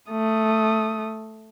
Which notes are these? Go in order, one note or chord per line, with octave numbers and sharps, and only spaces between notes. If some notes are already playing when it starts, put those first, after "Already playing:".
A3 D#6